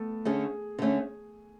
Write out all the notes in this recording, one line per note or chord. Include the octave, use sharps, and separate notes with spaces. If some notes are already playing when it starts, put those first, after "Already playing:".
Already playing: A3 B3 A4
D3 A3 C#4 G#4
D3 A3 C#4